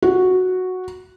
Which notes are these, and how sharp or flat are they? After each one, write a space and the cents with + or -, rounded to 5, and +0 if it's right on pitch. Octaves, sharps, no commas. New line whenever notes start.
F#4 -5